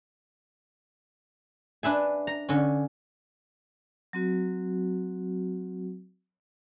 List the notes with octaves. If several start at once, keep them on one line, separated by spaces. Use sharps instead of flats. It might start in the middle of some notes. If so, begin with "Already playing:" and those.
D4 B4 E5 G#5
A#5
D3 C#4
F#3 C4 F#4